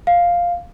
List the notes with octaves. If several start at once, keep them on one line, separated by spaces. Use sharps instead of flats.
F5